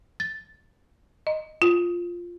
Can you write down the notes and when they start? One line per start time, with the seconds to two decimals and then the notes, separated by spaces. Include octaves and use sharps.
0.20 A6
1.27 D#5
1.62 F4